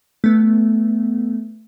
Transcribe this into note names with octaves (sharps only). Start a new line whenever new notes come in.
A3 B3